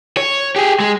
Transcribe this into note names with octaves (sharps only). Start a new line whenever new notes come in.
C#5
G4 G#4
G#3